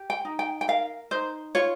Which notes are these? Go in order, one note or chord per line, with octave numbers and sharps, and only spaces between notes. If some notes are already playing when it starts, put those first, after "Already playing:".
Already playing: G4
G5
D#4
G5
G5
A#4 F5
D#4 C5
F4 C#5